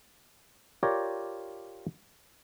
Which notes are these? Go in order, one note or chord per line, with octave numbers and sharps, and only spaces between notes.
F4 G4 A#4 C#5 D5